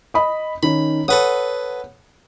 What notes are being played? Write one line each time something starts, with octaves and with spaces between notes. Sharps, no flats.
D#5 B5 D#6
D#3 C#4 D#4 B5
A4 B4 C#5 F#5 D#6